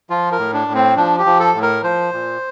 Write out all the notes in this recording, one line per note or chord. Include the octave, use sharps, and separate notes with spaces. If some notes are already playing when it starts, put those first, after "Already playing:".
F3 F4
A#4
A2
D4
A2
C4
F3 D4
G4
F3
A4
A2
A#4
F3 C5
A#2